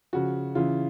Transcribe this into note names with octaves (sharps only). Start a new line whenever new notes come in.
C#3 F3 F#4
C#3 E3 F4